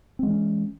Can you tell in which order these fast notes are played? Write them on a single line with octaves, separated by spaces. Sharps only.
C4 G#3 E3 C#4